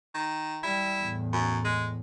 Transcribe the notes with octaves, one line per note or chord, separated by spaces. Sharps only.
D#3
G3 E4
E2 A2
F#2
G#3